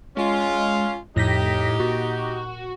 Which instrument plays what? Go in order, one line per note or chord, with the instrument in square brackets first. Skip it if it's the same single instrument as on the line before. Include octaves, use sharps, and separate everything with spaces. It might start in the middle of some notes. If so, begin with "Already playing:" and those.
[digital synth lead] G#3 [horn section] C#4 F4
[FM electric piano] F2 A#6 B6 [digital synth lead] A2 [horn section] D#4 G4
[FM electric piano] A#2 [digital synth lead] F#4